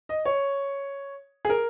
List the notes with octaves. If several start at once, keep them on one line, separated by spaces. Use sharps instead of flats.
D#5
C#5
G#4
A#4